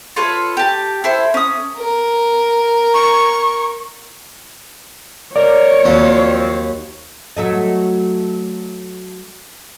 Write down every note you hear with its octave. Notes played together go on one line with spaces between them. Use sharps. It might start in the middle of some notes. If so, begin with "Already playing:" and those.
F4 A4 B4 C#5
G4 A5
E4 A4 C5
C#4 D#6
A#4
C#6
A#4 C#5 D5
D#2 F3 F#3 C4
F#3 A3 D#5